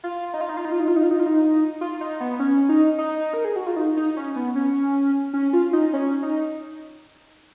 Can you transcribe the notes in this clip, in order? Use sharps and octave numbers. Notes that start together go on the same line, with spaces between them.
F4
D#4
F4
D#4
F4
D#4
F4
D#4
F4
D#4
F4
D#4
F4
D#4
F4
D#4
B3
C#4
D#4
D#4
A#4
G#4
F#4
F4
D#4
D#4
C#4
B3
C#4
C#4
F4
D#4
C#4
D#4